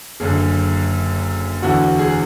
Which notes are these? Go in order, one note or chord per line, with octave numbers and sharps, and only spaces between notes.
F#1 F#2 D3 G#4
E1 E2 D3 F#4
G#4